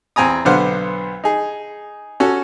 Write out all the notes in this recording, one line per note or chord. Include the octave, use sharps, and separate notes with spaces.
E2 C4 G#5 A#5 D#6
B1 D3 B3 C5 F5 F#5
D#4 G#4
C#4 F#4 A4